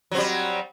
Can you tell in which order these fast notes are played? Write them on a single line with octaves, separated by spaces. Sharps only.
F#3 C4 G3